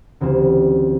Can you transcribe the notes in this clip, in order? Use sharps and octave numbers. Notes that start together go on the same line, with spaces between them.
D2 C#3 E3 G3 C4